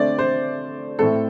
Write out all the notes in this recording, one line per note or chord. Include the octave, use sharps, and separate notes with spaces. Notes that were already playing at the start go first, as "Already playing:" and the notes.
Already playing: D3 A3 C4 D5
C5
A2 A3 C4 A4